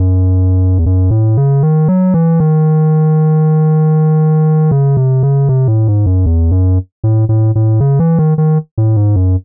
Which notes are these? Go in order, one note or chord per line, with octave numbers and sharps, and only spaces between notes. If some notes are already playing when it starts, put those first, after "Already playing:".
Already playing: F#2
E2
F#2
A2
C#3
D#3
F#3
E3
D#3
C#3
C3
C#3
C3
A2
G#2
F#2
E2
F#2
A2
A2
A2
C#3
E3
D#3
D#3
A2
G#2
F#2